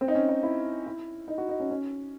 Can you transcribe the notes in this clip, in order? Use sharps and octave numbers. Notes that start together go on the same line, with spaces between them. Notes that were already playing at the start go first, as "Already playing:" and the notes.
C4
D#4
C#4
D#4
E4
E4
D#4
F#4
D#4
C#4
C#4